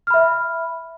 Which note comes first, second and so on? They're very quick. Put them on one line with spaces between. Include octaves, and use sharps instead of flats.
F6 B5 E5